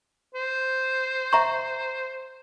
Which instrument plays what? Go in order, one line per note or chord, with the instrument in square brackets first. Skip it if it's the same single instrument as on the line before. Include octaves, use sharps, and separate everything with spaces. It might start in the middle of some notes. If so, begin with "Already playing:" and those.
[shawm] C5
[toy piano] E5 A#5 C#6